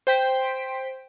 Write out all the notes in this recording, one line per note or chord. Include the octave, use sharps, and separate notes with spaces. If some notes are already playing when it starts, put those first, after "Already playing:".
C5 G5 B6